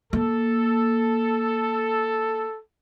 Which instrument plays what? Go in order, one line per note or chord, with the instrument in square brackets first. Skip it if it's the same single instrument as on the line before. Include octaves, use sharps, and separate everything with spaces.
[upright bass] A#3 [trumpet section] A4